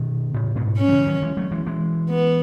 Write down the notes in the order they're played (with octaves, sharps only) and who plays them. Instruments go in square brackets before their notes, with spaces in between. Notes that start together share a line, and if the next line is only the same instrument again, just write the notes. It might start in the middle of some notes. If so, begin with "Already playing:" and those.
Already playing: [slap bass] B2 D#3
A2 C#3
G#2 B2
[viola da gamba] C#4
[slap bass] F#3
C#3 E3
D#3 F#3
E3 G#3
F#3 A3
E3 G#3
E3 G#3
[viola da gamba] B3